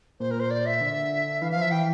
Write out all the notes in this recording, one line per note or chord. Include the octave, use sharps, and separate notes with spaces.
A#2 C5
A#4
C5
D5
E5
D3
E3 F5
F3 F5
E5
E3 G5